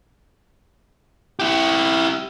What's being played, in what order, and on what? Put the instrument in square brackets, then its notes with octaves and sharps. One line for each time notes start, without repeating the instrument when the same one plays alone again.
[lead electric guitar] E4 G4